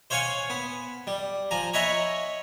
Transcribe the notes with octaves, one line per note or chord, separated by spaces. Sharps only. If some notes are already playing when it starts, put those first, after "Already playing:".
C5 C#5 F5 F#5 G#5 C#6
B3
G3
F3 G#5 A#5
C#5 D#5 E5 F#5 A#5 B5